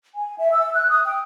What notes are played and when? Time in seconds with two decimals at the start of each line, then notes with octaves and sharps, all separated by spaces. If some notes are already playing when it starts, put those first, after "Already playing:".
0.15 G#5
0.38 E5
0.51 E6
0.74 F#6
0.88 D#6
1.05 G5